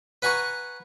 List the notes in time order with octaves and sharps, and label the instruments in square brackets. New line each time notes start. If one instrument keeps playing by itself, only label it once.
[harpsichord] B4 F#5 G#5 A#5 C#6